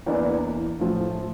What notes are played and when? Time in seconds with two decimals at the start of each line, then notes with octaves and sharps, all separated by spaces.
0.07 E2 E3 A#3 D4
0.80 A2 F3 A3